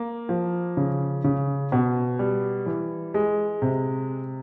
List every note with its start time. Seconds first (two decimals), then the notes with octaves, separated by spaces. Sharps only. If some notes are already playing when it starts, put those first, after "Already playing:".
Already playing: A#3
0.29 F3
0.77 C#3
1.24 C#3
1.72 B2
2.19 G3
2.66 E3
3.14 G#3
3.62 C3